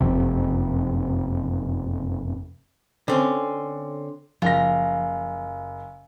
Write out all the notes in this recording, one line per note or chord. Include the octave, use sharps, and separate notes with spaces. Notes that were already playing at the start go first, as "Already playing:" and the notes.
F#1 F2 C3
D3 C4 C#4
F#1 F3 F4 F5 G#5 A#6